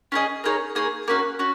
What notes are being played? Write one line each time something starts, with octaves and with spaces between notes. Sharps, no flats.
C#4 F4 G#4 D#5
A#3 D#4 G#4 C#5
A#3 D#4 G#4 C#5
A#3 C#4 F#4
C#4 F#4